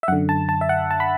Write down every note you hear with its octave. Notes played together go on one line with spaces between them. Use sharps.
E5
F#2 D3 F#5
A5
A5
E5
F#5
A5
B5